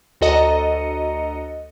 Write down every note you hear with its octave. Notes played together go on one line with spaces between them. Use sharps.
D2 F#4 A4 D#5 A#5 C#7